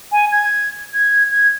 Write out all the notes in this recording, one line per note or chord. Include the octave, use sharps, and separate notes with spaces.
G#5
G#6
G#6
G#6